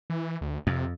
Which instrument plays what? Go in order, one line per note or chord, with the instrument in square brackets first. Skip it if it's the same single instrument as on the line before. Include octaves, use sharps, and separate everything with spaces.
[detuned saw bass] E3
D2
[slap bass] F2 [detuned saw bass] C3